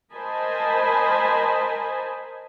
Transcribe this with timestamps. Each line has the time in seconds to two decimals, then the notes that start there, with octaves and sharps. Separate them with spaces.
0.14 A#4 C5 D#5 G#5 A5 B5